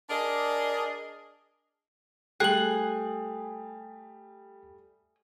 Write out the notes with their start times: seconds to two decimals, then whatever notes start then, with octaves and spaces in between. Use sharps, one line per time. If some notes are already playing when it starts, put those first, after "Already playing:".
0.10 D4 G#4 A#4 D5 D#5
2.40 G3 A3 G#4 G5 F#6 C7 F#7